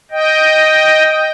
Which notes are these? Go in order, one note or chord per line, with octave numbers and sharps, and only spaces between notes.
D#5 G5